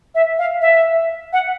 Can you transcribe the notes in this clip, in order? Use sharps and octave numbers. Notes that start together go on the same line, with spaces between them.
E5
F5
E5
F#5